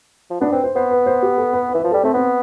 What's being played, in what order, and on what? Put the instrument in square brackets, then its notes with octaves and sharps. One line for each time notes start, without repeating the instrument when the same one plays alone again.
[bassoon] F3
[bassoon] B3 [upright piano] D4
[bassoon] C4 [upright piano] B4
[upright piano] C5
[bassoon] B3 [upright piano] C5
[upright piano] B4
C5
G4
A4
B4
B4
[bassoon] E3
[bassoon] F3 [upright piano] B4
[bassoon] G3 [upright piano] A4
[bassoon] A3 [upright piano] C4
[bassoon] B3 [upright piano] C4